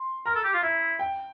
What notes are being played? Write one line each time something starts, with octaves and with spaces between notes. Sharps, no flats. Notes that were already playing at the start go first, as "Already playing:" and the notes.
Already playing: C6
A#4 A#5
A4
G4
F4
E4 E5
G5